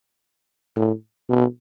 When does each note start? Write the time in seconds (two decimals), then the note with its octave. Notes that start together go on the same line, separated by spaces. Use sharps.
0.76 A2
1.29 B2